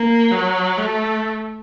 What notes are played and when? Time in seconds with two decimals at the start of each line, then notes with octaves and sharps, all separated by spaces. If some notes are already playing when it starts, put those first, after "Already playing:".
Already playing: A#3
0.31 F#3
0.78 A3